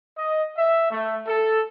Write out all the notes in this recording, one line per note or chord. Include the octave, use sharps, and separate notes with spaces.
D#5
E5
A3
A4